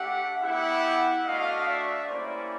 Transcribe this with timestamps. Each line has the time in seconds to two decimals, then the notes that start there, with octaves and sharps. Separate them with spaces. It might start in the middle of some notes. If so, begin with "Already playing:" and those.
Already playing: A3 D4 G4 E5 F#5
0.42 B3 E4 G4 E5 F#5
1.25 A3 D4 F#4 D#5 F5
1.67 D5 E5
2.08 G3 A#3 C#4 E4 C5 D5